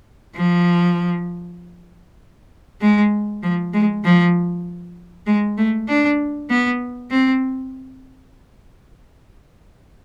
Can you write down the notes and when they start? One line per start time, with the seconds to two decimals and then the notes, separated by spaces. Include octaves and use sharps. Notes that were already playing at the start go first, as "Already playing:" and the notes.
0.36 F3
2.81 G#3
3.43 F3
3.74 G#3
4.05 F3
5.26 G#3
5.58 A3
5.89 D4
6.50 B3
7.11 C4